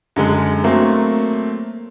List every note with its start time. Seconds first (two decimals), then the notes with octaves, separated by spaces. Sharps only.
0.16 F#2 D3 G#3
0.64 F#3 A3 A#3 C4